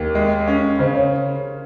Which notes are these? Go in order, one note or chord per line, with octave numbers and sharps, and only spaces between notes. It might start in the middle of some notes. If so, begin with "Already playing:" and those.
Already playing: D#2 A#4
G#3
C#4
C#3 C5
C#5